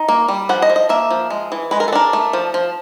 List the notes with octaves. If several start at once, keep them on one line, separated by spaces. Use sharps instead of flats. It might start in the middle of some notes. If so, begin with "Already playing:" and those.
Already playing: D#4
A#3
G3
F3 F#5
D#5
F3
D#5
A#3 E5
F3
G#3
E3
G#3 B4
A#4
A4
D4 A#4
A3
F3
F3